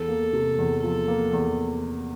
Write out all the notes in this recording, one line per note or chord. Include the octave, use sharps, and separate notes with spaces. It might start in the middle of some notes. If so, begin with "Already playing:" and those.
Already playing: E2 A4
A#3
C3
E2
F3 A4
A#3
E2